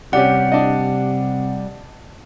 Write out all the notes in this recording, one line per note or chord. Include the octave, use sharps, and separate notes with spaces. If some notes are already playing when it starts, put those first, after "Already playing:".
C3 G3 C#4 G4 D5 F#5
D4 D#5